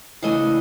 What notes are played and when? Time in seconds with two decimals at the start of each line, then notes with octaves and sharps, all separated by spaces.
0.22 C#3 E3 A3 D4 D#5